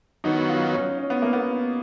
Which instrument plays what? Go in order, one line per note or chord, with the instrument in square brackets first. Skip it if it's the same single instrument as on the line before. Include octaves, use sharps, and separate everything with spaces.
[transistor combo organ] F#2 D#3 F#3 B3 [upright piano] D#4
[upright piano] F4
C#4
C#4
B3
A#3
B3